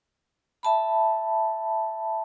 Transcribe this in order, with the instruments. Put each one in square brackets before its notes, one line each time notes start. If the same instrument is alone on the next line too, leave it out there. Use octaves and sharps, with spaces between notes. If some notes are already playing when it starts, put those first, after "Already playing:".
[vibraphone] E5 A5 B5